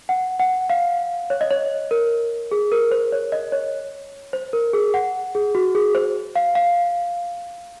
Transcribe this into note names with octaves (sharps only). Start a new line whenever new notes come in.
F#5
F#5
F5
C#5
D#5
C#5
A#4
G#4
A#4
C5
C#5
D#5
C#5
C5
A#4
G#4
F#5
G#4
F#4
G#4
C5
F5
F5